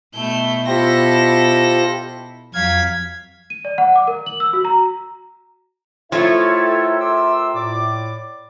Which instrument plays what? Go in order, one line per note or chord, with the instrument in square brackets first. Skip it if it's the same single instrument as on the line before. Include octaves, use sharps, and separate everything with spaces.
[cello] B2 E4 [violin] A3 G6
[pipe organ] F4 G4 C5 [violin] A4 A#6
[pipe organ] F2 F5 [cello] F#3 [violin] G#6 B6
[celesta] D#7
D5
F#5
D6
A#4
F#7
E6
F#4
A#5
[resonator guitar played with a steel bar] F3 A3 [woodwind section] E4 A4 C#5 [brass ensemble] G4 A#4 E5
[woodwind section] C6 D6 E6
A2 D5 D6